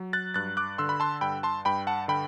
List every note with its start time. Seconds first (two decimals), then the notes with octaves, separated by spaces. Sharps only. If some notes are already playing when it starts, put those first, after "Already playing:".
Already playing: F#3
0.13 F#6 A6
0.34 G2 F#6 A6
0.57 D6 F#6
0.78 D3 C6 E6
0.89 B5
1.00 A5 C6
1.21 G2 G5 B5
1.43 A5 C6
1.65 G2 G5 B5
1.87 F#5 A5
2.08 D3 G5 B5